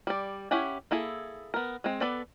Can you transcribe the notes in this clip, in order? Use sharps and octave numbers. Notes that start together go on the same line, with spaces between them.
G3 D5
C#4 E4 G4 F#5 G#5
A#3 E4 G#4 A4
B3 A#4
G#3 C4
B3 A4 B4 D5